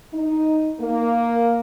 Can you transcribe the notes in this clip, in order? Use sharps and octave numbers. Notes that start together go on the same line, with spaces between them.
D#4
A#3